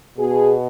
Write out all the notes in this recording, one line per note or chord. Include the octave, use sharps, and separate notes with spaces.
B2 G#4